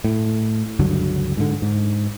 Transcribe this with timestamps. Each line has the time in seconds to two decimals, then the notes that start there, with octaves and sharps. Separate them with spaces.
0.04 A2
0.79 C#2 G2 D3 F#3
1.37 G#2 D3
1.62 G#2